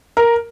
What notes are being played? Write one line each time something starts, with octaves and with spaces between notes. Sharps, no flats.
A#4